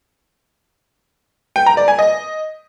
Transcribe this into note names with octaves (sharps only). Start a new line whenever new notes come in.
G5
A#5
D5
G#5
D#5